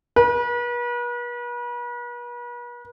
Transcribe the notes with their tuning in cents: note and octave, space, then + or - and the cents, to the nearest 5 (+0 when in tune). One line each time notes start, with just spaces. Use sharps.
B4 -40